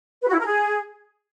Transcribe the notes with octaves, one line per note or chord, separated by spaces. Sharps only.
B4
F#4
E4
A#4
G#4